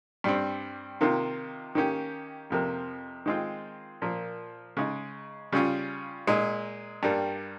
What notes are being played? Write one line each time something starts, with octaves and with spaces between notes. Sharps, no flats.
G2 G3 C4
C3 D#3 A#3 F4
D#3 A#3 C#4 G4
F2 C3 F3 A#3
D#3 G#3 C4 F4
A#2 F3 A#3
C#3 G#3 D#4
C#3 G3 C#4 F4
A#2 G#3 D#4
G2 G3 A#3